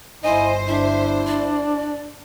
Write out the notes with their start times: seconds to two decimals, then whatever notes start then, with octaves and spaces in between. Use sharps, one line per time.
0.24 G1 E4 C5 D#5 G#5
0.68 D4 E4 E5
1.26 D5